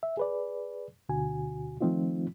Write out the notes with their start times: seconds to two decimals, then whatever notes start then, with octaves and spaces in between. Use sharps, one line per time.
0.03 E5
0.17 G#4 B4 D5
1.09 D2 B2 D3 F#4 G#5
1.81 D#3 F3 A3 C4 D#4 F4